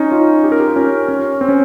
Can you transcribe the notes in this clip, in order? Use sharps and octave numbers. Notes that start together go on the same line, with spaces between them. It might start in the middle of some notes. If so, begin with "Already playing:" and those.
Already playing: C#4 D#4
F4
G4
A#4
G4
F4
C#4
C#4
C4
C#4